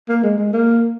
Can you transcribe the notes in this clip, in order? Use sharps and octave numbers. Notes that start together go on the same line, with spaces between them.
A#3
G#3
G#3
A#3